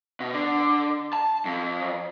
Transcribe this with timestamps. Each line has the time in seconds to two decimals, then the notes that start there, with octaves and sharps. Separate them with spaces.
0.20 B2
0.33 D3
1.13 A5
1.45 F2